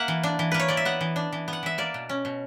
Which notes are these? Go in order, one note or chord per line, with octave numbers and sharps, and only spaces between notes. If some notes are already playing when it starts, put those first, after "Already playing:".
Already playing: A#3 E5 F#5
E3
D4
E3
A#3 B4
C#5
E3 D5
E5
B3 F#5
E3
D4
E3
B3
F#5
E3 E5
A#3 D5
B2
C#4
B2